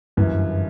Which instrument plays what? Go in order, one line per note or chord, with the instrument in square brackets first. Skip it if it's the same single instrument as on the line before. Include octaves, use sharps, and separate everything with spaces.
[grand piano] G1 F#2 E3